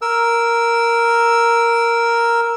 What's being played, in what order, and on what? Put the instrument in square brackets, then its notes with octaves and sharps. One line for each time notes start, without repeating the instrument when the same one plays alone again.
[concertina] A#4 E6